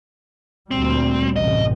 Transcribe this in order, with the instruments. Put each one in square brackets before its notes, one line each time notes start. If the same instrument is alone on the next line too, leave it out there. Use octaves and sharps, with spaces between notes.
[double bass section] D2 A#2 G3 [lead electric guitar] C4
[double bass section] A1 F#2 C3 [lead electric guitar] D#5